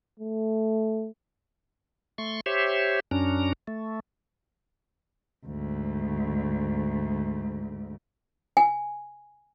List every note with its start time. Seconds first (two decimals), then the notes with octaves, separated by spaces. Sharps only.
0.20 A3
2.18 A3 C6 C#6
2.46 G4 C5 C#5 E5
3.11 F#2 C#4 D4 A#5
3.67 A3
5.45 D2 G#2
8.57 G#5